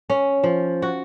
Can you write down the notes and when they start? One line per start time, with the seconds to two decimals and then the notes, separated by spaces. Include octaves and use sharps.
0.10 C#4
0.43 F3
0.82 F#4